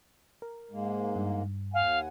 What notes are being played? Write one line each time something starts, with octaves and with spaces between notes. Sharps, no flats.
A#4
G#2 G#3 A#3
G2
D#2 F5 F#5 G#5